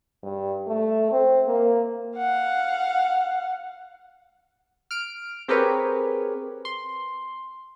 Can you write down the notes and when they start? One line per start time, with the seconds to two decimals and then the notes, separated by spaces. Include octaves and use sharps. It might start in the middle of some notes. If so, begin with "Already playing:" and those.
0.23 G2
0.67 A3
1.12 C4
1.47 A#3
2.17 F5 F#5
4.91 F6 D7
5.48 C4 G4 G#4 A#4 B4 C#5
6.65 C6